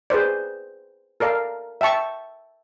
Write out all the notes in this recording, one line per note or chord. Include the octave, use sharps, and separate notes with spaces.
G#4 B4 C5 D5
A4 A#4 D5 F5
E5 G5 A5 C#6